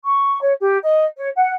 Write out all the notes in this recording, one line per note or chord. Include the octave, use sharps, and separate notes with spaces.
C#6
C#5
G4
D#5
C#5
F#5